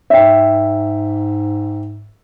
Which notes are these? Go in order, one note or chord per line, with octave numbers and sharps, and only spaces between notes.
G#2 E5 G5